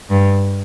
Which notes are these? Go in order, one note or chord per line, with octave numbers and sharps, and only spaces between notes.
G2